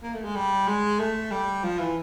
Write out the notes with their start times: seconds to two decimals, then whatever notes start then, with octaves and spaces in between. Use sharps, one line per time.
0.02 A#3
0.14 A3
0.25 G#3
0.36 G3
0.68 G#3
1.00 A3
1.32 G3
1.64 F3
1.79 E3